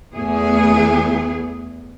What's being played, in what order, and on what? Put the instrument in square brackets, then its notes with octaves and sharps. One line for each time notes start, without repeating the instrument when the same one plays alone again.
[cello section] E2 A3 B3 G#4